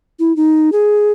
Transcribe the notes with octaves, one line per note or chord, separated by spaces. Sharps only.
E4
D#4
G#4